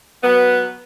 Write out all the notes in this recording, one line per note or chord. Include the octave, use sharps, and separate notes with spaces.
F#3 B3